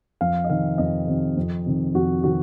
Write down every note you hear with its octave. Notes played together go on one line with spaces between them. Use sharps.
F2 F5
D#5
C3 D#3 F5
F2 D#5
C3 D#3
F2
C3 D#3
F2 F#4
C3 D#3 F#4